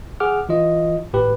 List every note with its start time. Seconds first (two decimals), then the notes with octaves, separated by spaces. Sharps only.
0.20 G#4 F#5 D6 F6
0.49 E3 F4 D#5
1.13 G#1 A2 G4 B4